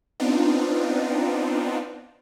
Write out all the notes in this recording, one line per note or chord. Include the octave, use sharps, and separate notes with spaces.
B3 C4 D4 D#4 F4